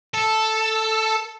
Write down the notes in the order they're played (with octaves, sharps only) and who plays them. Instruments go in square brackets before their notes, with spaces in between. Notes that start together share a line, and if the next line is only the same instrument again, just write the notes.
[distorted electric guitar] A4